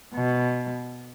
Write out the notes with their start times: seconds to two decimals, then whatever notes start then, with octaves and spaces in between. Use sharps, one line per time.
0.15 B2